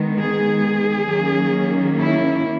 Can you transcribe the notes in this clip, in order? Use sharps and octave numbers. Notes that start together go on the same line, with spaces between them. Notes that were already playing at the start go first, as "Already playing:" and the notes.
Already playing: D#3 G#3 B3
G#4
D#3 F#3 A#3 C#4
E4